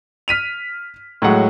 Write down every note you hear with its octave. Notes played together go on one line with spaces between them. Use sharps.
F6 B6 D#7 F7
A2 F#3 G#3 F#5